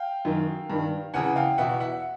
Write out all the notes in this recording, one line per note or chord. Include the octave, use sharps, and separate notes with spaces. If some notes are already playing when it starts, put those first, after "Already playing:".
Already playing: F5 G5
F#2 D#3
G2 D#3
E2 C#3 E3 F#5 G#5
F5 G5
E2 B2 E5 F#5
E5 F#5